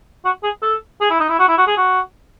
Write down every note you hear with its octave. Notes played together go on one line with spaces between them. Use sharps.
F#4
G#4
A4
G#4
E4
D#4
E4
F#4
E4
F#4
G#4
F#4